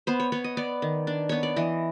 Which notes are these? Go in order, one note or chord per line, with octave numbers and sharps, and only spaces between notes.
B3 C5
C#5
B3 C#5
D#5
B3 D5
D#3
D4
B3 C#5
D5
E3 D#5